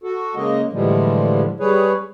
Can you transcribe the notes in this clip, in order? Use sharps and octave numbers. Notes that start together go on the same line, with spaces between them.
F#4 A4
C#3 G#3 A#3 D#5
A2 D3 E3 F3 G3 G#3
G3 G#4 B4 C#5